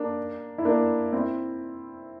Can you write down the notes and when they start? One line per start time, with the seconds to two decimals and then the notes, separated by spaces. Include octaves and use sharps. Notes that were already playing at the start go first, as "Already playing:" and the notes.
Already playing: A#3 D4
0.58 E4
0.65 A#3 D4
1.13 C4 E4